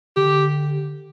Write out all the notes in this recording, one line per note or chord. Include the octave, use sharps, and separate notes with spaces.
D3 G4